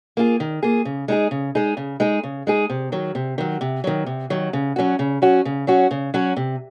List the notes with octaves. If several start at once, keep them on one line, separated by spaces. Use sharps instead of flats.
A#3 F4 G#4
D#3
A#3 F4 G#4
C#3
G#3 D#4 G#4
C#3
G#3 D#4 G#4
C#3
G#3 D#4 G#4
C#3
G#3 D#4 G#4
C3
D#3 F#3
C3
D#3 F#3
C3
D#3 F#3
C3
D#3 F#3
C#3
F#3 C#4 F#4
C#3
F#3 C#4 F#4
C#3
F#3 C#4 F#4
C#3
F#3 C#4 F#4
C3